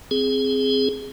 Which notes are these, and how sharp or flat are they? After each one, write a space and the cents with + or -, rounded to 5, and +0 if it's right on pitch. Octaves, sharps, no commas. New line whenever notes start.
C4 -5 G#4 +0